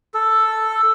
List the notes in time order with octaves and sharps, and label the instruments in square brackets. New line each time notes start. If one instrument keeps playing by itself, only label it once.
[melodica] A4